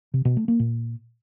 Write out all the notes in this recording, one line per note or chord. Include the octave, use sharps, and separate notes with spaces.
C3
B2
A3
A#3
A#2